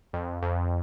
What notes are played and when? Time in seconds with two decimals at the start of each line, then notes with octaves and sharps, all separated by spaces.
0.13 F2
0.42 F2